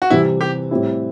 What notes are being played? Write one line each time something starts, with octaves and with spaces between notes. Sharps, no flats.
F#4
C3 E3 G3 C4 E4
G4
A2 G3 C4 E4